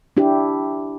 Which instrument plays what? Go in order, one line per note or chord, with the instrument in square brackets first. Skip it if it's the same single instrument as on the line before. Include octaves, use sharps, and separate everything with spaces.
[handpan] D4 E4 G4